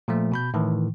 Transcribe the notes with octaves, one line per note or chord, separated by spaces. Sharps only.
A#2 F3 A3
B2 B5 G6
A2 D#3 E3